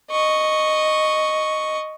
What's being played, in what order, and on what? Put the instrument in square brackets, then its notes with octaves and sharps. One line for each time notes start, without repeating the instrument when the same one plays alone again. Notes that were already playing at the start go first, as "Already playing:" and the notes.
[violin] D#5 C#6